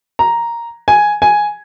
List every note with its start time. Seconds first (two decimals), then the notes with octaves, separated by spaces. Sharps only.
0.19 A#5
0.88 G#5
1.22 G#5